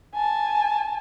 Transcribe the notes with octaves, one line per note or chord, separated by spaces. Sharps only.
G#5 A5